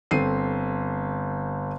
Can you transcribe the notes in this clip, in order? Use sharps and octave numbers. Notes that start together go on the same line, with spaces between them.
G1 C4 A4 C7 D#7